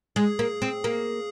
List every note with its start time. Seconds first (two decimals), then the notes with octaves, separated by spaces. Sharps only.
0.16 G#3 G#4
0.39 A#3
0.62 C4
0.84 A#3